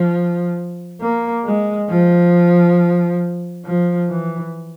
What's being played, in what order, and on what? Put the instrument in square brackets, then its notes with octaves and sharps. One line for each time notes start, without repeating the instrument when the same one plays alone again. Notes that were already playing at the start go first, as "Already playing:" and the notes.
Already playing: [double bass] F3
A#3
G#3
F3
F3
E3